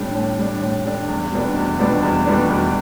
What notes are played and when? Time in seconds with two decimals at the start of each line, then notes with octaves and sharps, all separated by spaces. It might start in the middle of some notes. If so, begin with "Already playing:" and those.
Already playing: A2 G3 D4
0.15 A2
0.39 G3 D4
0.62 A2
0.85 G3 D4
1.08 E2
1.32 B2 G3 B3 D4
1.56 E2
1.79 B2 G3 B3 D4
2.03 E2
2.26 B2 G3 B3 D4
2.50 E2